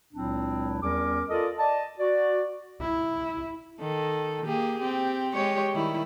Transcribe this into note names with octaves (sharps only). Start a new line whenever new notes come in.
C#2 A#2 F#3 C4 D4 E4
E2 G3 C#4 A#4 D6
F4 A4 A#4 D5 D#5
D5 D#5 A5
F#4 D5
E4
D#3 A4
A#3 G4 G#4
C4 G4
G#3 G4 C#5
D#3 G3 E4